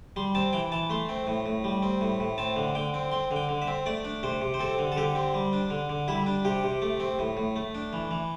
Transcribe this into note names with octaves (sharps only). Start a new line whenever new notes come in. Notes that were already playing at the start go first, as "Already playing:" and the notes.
G3 C6
C4 A5
E3 G5
E3 A5
A3 C6
C4
A2
A2
G3
C4
A2
A2
C4 A5
D3
D3 G5
C4
C4 C6
D3
G5
D3
E5
C4
A3 D5
D4
C3 C5
C3
C5
C4 A4
D3
A4
D3 G4
C4
G3
D4
D3
D3
G3 E4
D4
C3 G4
C3
A3
C4
A2
A2
A3
D4
E3
E3